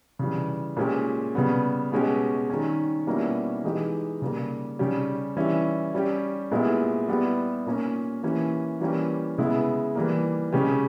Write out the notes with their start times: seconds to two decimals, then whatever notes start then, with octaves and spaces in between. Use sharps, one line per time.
0.19 C#3 E3 G3
0.77 A#2 G#3 C#4 G4
1.35 C#3 G3 B3
1.92 B2 G#3 C#4 G4
2.50 D#3 G3 C#4
3.07 B2 G3 A#3 C#4 E4
3.64 E3 G#3 D#4 G4
4.22 C#3 G3 A#3
4.79 C#3 G3 C#4 G4
5.37 E3 G3 C#4 E4
5.94 G3 C#4 G4
6.51 A#2 G#3 B3 E4 G4
7.08 G3 B3 E4 G4
7.66 A#2 A#3 C#4
8.23 E3 A#3 C#4 E4 G4
8.81 E3 G3 A#3 C#4 G4
9.38 C#3 G#3 B3 E4
9.95 E3 G3 A#3
10.53 C#3 G#3 C#4 G4